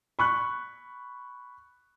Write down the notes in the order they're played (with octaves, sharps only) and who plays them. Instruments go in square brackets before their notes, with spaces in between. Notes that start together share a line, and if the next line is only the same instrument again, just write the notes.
[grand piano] B5 C#6 F#6